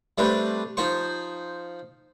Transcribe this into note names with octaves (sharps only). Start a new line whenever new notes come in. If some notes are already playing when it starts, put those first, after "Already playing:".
G3 A3 C4 D4 B4
F3 D#4 C5 C#6